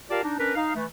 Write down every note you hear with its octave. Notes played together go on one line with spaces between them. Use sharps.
F4 G4 A#4 D5 F5 A5
D4 D#4
C#4 D4 A#4 B4
D#4 F5
E3 A3